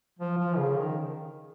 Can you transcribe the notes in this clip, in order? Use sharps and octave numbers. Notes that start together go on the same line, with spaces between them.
F3
F3
C#3
D#3